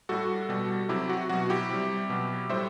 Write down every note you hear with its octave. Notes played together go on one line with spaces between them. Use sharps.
A2 G3 F#4 A4
B2 G3
C3 F#3 E4 G4
F#4
B2 F#3 F#4
E4 G4
C3 G3
B2 F#3
A2 G3 C5 E5